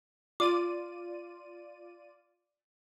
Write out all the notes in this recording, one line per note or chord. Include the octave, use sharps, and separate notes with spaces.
F4 D5 D6 D#7